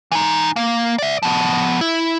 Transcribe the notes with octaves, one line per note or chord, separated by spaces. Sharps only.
E3 D#4
A#3
D5 E5
F3 B3
E4